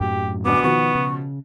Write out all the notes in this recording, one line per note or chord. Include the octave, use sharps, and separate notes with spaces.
F#2 A2 F#3 G4
D2 B2 B3 D6
B2 D#3 F3 F#4 C#6
C#3